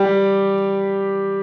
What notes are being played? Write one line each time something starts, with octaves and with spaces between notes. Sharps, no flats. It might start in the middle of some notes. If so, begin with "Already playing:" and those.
Already playing: G3 G4